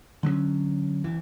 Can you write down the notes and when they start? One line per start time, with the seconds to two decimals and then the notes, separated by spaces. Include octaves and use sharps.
0.23 D3 F#3 A3 C#4
1.04 C2 E3